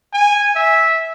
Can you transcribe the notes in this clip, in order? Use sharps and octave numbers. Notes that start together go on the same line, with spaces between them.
G#5
E5